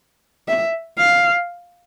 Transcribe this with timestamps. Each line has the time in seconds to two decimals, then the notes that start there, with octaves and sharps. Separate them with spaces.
0.48 E5
0.98 F5